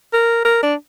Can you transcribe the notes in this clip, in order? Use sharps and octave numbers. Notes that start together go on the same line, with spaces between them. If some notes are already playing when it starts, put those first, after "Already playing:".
A#4
A#4
D4